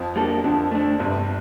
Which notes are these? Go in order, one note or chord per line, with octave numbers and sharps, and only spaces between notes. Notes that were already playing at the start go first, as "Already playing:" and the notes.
Already playing: F2 F3
G3 A#3 D4 A4
F2 D3 F3
A3 D4
G1 G2 C3